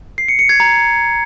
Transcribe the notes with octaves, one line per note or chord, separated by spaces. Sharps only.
C7
C#7
C#7
G#6
A#5